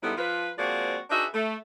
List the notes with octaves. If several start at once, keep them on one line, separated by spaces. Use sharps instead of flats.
G#2 D3 G3 A3 B3 E4
F3 F4 B4
F3 G#3 A#3 C4 F#4 D5
D4 D#4 F#4 G#4 B4 E5
A3